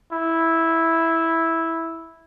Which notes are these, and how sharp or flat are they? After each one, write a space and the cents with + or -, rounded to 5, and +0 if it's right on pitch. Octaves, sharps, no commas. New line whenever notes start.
E4 -5